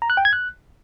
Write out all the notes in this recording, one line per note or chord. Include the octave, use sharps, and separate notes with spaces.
A#5
F#6
G5
G#6
F#6